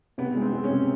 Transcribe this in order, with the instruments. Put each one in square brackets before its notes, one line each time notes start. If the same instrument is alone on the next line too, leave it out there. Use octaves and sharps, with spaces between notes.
[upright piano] C3 [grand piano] B3
[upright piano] G#3
[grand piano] C4
[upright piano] G#3
[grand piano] C#4
[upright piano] C3